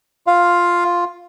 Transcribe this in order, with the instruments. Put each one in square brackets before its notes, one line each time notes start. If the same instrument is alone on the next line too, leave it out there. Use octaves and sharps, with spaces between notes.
[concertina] F4 F5